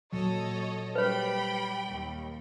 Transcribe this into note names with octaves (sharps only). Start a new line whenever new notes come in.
A#2 F#3 A4 C#5 D#5
G3 B4 C#5 G5 B5
D#2